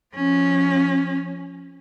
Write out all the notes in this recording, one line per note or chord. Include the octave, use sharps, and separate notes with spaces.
F3 C#4